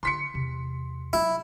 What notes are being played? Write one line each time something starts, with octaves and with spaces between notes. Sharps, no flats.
D3 B3 C6 B6 C#7
E2 C3
F#3 E4